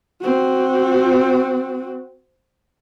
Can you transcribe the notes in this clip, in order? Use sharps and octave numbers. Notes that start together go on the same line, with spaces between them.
C4 F#4